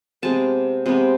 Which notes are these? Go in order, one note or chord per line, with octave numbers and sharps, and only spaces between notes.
C3 G#3 B3 A5
C3 G#3 B3